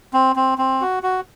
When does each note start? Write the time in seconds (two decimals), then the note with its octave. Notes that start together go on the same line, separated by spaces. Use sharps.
0.13 C4
0.36 C4
0.58 C4
0.81 F#4
1.03 F#4